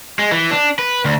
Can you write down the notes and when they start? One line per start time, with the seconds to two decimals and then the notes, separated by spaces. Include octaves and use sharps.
0.19 G#3
0.32 E3
0.51 D4
0.79 B4
1.05 D2